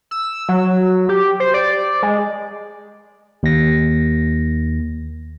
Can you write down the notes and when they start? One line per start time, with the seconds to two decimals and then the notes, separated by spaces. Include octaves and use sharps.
0.11 E6
0.49 F#3
1.09 G4
1.40 C5
1.54 D5
2.03 G#3
3.43 D#2 A#6